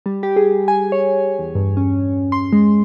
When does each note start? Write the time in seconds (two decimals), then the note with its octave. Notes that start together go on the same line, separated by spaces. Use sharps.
0.06 G3
0.23 G4
0.36 G#4
0.68 G#5
0.92 C#5
1.39 E2
1.55 G2
1.77 C#4
2.32 C6
2.53 G#3